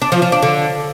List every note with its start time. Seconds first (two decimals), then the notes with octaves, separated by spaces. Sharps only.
0.02 D4
0.12 F3
0.22 F3
0.32 D4
0.42 D3